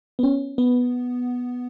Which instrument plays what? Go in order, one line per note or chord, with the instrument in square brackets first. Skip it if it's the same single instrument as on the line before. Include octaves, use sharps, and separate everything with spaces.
[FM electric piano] B3
C#4
B3